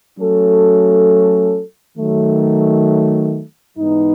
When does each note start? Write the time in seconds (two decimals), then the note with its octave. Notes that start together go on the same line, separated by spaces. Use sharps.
0.17 F#3 A3 C#4 F#4 A4
1.96 D#3 F#3 A3
3.77 G#2 E3 B3 D#4